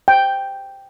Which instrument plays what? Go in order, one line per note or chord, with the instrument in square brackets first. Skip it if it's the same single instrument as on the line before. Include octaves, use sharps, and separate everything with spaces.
[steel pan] G5